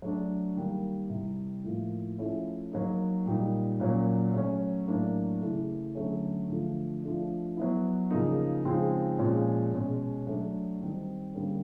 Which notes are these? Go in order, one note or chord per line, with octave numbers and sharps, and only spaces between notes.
F#3 A3 D4
D#3 G3 A#3
C3 E3 G3
A2 F3 A#3
F3 A3 C#4 E4
F#3 A#3 D#4
A#2 G3 A#3 D#4
A#2 F#3 A#3 C#4
F#3 A3 C#4
A2 F#3 A#3 D4
C#3 E3 A3
D3 F#3 A3 C#4
D3 F3 A3
F3 A3 D4
F#3 B3 E4
C#3 F3 A#3 D#4
C#3 F3 G#3 C4 D#4
A#2 F3 G#3 C#4
B2 G#3 C#4
F#3 A3 D4
D#3 G3 C4 D#4
D3 G3 A#3 C#4